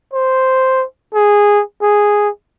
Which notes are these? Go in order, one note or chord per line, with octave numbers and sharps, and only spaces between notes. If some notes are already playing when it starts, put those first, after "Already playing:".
C5
G#4
G#4